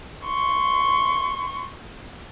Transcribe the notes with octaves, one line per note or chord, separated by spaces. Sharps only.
C6 C#6